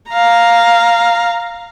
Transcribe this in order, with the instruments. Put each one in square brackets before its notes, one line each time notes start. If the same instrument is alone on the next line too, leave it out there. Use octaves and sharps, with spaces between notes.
[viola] F5 A#5